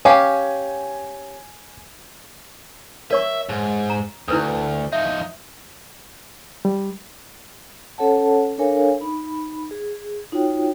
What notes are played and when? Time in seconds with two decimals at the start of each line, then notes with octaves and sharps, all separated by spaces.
0.05 C#4 G4 F5 G#5
3.11 A#4 C#5 E5 C#6
3.49 G#2
3.90 A#5
4.28 D2 E4 B4 D#6
4.93 F3 D#4 E5
6.65 G3
7.98 C#4 A4 C#5 F#5 A5
8.58 D4 A4 A#4 C#5 F5 G#5
9.01 D#4 B5
9.71 G#4
10.32 D#4 F4 F#4 C#5 G5